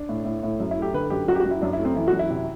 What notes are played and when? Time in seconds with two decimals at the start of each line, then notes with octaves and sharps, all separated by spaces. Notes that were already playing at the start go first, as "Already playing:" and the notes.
Already playing: D4
0.09 A2
0.25 A2
0.43 A2
0.60 F#2
0.71 E4
0.77 A3 G4
0.94 D3 B4
1.10 F#2 G4
1.28 F#2 F#4
1.35 G4
1.40 F#4
1.46 F#2
1.51 E4
1.62 F#2 D4
1.73 E4
1.79 A3
1.85 C4
1.96 E3 E4
2.08 F#4
2.13 F#2
2.19 E4
2.30 C3